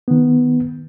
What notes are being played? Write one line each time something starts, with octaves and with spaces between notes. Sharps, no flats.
D#3 B3